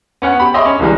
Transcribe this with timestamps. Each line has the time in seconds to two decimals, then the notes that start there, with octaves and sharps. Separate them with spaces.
0.22 B3 C#4 F#5
0.40 G4 B5
0.54 C#5 D#5 E5 B5 C6 D6
0.65 C#4
0.79 C#2 E3 G3 G#3